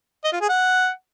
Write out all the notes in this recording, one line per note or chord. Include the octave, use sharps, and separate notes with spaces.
D#5
F4
G#4
F#5